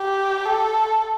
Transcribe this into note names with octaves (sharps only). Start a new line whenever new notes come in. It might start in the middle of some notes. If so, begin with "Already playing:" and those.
Already playing: G4
A4